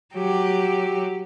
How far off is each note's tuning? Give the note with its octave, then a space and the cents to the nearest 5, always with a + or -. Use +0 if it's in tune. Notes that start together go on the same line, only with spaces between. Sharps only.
F#3 +5 G4 +0